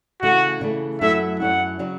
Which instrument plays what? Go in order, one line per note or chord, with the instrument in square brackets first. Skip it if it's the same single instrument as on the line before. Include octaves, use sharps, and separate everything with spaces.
[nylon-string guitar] C#3 E3 A3 [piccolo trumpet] F#4
[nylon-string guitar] C#3 E3 A3
[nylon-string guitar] F#2 F#3 A3 C#4 E4 [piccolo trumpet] E5
[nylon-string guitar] F#2 F#3 A3 C#4 E4 [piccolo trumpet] F#5
[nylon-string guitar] C#3 F#3 C#4